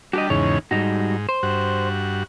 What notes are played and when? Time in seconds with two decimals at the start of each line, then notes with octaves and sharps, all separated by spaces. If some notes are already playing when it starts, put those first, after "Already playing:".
0.13 G3 D4 F#4 G4 D#5
0.30 E2 G#2 C#3 D#4 C#5
0.71 G#2 G3 D#4 F#4
1.29 C5
1.43 G2 F#4